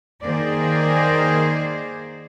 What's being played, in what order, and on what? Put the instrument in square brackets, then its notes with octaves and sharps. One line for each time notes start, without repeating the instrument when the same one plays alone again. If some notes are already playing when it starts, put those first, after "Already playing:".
[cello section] D#3 A#3 G#4 C5 D5